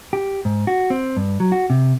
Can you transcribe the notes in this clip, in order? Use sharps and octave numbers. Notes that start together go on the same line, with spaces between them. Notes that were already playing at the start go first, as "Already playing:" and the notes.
G4
G#2
F#4
C4
G2
F#3
F#4
C3